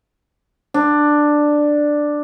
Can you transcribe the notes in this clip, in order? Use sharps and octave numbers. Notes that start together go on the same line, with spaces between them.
D4